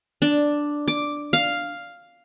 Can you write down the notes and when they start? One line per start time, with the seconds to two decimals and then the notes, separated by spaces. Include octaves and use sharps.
0.22 D4
0.88 D6
1.33 F5